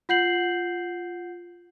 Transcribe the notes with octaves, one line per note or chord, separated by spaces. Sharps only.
F4 F#5 G6 C7 F#7